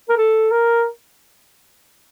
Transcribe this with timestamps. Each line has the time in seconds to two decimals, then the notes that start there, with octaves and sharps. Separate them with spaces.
0.09 A#4
0.17 A4
0.51 A#4